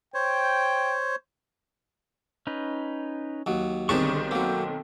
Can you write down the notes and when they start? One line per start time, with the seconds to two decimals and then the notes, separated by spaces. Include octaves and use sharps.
0.14 C5 C#5 G5
2.47 C#4 D#4 B4
3.46 D#2 F#3
3.89 B1 D3 D#3 G3 C4 G#4 A5 C#6
4.31 F#3 A#3 A4 G5